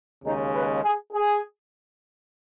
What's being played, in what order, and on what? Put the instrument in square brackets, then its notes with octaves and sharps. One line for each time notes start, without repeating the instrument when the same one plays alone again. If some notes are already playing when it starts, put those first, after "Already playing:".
[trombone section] D#2 C#3 G#3 D#4
B4
G#4
G#4